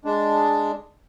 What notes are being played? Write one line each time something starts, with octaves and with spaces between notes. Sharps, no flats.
G#3 D4